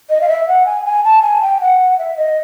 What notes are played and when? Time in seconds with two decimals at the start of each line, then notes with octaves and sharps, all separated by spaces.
0.09 D#5
0.21 F5
0.28 E5
0.47 F#5
0.65 G#5
0.85 G#5
1.03 A5
1.22 G#5
1.41 G5
1.60 F#5
1.98 E5
2.17 D#5